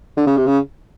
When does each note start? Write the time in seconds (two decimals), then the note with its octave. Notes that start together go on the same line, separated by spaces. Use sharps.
0.17 D3
0.27 C#3
0.37 C3
0.46 C#3